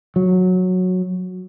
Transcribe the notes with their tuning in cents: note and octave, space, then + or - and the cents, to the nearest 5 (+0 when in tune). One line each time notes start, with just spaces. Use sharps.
F#3 -10